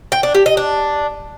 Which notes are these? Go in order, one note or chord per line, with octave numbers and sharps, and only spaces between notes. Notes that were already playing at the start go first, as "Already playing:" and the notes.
G5
D4
G4
D#5
D4